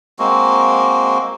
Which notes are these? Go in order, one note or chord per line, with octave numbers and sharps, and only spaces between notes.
G#3 A#3 C4 F#4